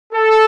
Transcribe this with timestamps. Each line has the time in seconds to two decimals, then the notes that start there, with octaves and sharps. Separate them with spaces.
0.13 A4